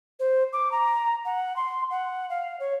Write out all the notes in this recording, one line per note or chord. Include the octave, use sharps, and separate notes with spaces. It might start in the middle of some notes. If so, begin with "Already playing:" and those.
C5
D6
A#5
F#5
C6
F#5
F5
C#5